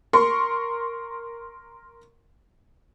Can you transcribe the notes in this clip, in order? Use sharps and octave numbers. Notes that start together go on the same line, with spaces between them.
A#4 C6 C#6